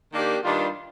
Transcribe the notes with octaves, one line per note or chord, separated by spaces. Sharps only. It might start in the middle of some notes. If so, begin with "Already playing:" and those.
D#3 A#3 D4 G4 D5
G2 D#3 G3 D4 F4